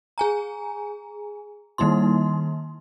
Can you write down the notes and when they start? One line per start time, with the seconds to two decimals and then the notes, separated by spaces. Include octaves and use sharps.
0.18 G#4 G#5 A#5
1.78 D#3 G3 A#3 D#4 E4 C6